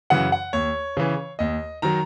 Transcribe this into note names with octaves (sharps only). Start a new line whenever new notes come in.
F#2 C#3 E3 F#5
F#5
D#2 C#5
C#3 E3
D#2 D#5
D#3 F#3 A#5